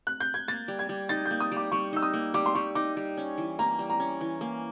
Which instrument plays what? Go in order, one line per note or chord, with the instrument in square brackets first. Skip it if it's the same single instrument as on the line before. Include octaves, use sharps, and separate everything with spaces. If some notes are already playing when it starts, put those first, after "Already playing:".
[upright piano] F#6
G6
G#6
[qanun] A#3 [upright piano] A6
[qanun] G3
[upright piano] G#6
[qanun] G3
[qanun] D#4 [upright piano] A6
[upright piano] G6
[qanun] A#3
[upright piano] D#6
[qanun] G3
[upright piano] D6
[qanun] G3 [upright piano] C#6
[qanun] D#4 [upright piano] E6
[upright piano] D#6
[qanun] A#3
[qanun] G3 [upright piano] D6
[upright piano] C6
[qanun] G3 [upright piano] C#6
[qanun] D#4 [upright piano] D6
[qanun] G3
C#4
E3
[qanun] A#3 [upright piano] A#5
[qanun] G3
[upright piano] A#5
[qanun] C#4
E3
A#3